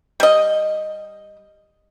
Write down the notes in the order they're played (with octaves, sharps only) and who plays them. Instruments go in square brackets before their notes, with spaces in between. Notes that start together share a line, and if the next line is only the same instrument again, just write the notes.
[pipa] G3 D#5